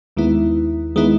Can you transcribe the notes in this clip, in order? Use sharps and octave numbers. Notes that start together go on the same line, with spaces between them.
D#2 D#3 G#3 B3 E4
D#3 G#3 B3 E4